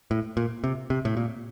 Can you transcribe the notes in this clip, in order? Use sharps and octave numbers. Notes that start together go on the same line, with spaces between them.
A2
A#2
C3
C3
A2
A#2